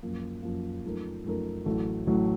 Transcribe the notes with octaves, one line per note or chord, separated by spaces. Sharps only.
F#2 F3 A#3
F#2 F3 A#3
F#2 F3 A3 D#4 A#4
F#2 F3 A3 D#4 A#4
A1 A2 F#3 A3
A1 A2 F#3 A3